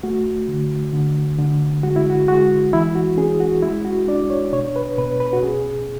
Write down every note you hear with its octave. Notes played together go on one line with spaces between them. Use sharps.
A3 F#4
D3
D3
D3
G#3 F#4
E4
F#4
G#3 F#4
E3 E4
F#4
C#4 G#4
F#4
G#3 E4
F#4
D4 D5
C#5
B2 C#5
B4
B2 B4
B4
F#4
C#4 G#4